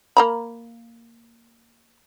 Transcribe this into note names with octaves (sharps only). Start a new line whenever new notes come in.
A#3 A#5 B5